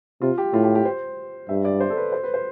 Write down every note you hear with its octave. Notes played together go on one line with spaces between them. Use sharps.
C3 F4
G4
A2 F4
G4
G4
C5
G2 E5
D5
C5
A4
B4
C5
B4
C5